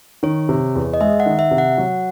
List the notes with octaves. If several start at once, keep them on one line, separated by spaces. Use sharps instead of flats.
D#3 C#5
C3
E2
D#5
G#3 E5
F#5
D#3
E5
C3
F#5
F#3